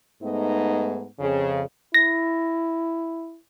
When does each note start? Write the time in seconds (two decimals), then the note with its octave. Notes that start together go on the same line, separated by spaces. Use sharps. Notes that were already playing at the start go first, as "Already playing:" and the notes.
0.22 G#2 A3 B3 D#4
1.19 F2 C#3
1.94 E4 A#6